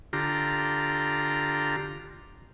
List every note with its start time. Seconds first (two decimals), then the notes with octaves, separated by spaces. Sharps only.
0.13 D3 F4 G4 A#5